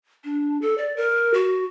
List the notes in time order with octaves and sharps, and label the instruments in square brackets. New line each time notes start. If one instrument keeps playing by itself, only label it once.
[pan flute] D4
A4
D5
A#4
F#4